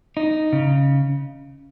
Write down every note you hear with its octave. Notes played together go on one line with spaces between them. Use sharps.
D#4
C#3